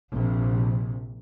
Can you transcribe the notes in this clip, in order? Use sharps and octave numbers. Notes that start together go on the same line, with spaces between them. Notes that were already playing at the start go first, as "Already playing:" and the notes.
A#1 C3